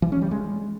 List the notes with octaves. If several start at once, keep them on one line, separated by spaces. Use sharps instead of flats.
E3
C#4
G3
G#3